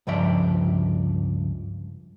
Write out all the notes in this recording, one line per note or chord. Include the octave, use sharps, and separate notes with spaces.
C#2 G2 F3 D5 E5